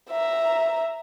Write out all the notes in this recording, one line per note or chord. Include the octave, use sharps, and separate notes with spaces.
E5 A#5